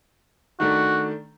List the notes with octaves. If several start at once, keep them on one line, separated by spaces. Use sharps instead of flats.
D#3 A3 D4 F#4